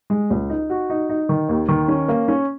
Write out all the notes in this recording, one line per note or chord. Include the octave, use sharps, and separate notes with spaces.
G#3
C#2
D#4
F#4
D#4
D#4
D#3
D#2
D#3
C#4
A#3
C#4